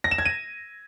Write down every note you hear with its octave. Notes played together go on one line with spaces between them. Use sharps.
A#6
E7
G#6
D#7